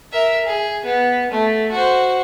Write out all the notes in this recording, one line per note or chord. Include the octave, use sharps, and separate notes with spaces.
A#4 E5
G#4
B3
A3
F#4 C5